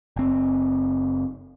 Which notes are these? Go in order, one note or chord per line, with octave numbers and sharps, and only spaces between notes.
F#1 C4